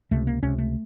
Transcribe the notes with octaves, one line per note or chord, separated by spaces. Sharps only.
C#2 C3 A3
A#3
C#2 C3 C#4
A3